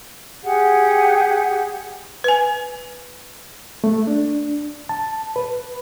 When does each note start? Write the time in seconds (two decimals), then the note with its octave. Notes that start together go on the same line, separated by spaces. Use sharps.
0.43 G4 G#4 F#5
2.24 B4 G#5
3.84 A3
4.07 D4
4.89 A5
5.36 B4